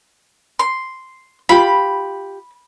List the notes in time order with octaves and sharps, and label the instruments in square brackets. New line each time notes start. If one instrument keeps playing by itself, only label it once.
[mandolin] C6
[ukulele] F4 G4 [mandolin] B5